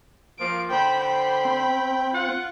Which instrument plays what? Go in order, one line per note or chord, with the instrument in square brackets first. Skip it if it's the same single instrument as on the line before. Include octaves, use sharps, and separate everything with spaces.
[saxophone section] F3 A#3 [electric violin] D7
[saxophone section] D3 C5 [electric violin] G5 B5
[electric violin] G5 B5
[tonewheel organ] C4
[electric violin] F4 [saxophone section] F#5